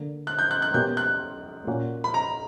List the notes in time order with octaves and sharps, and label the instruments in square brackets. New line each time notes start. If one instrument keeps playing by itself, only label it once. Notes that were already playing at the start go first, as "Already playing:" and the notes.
Already playing: [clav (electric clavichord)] D3 A#3
[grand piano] F#6
G6
F#6
F#6
[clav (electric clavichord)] B2 A#3 C#4 G4 [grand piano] G6
[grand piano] F#6
[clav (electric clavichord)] A#2 A#3 C#4 F#4
[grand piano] B5
A#5